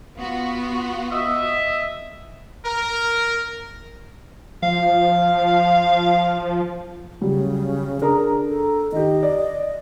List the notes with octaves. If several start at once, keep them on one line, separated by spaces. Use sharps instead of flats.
B3 F4 F#4
D#5 E5
A#4
F3 F5
C#3 F#3 G3
D4 G#4 A#4 A#5
A4
D#3 G4 D#5
D5